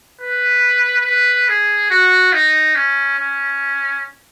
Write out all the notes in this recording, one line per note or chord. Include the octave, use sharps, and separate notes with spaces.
B4
B4
G#4
F#4
D#4
C#4
C#4